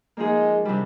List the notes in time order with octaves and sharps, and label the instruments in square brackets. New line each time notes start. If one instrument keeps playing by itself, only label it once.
[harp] F3 A#3 D#4 G#4 [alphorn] G#3
[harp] C3 G3 D4